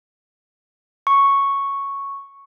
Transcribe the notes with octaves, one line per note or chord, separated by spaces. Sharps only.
C#6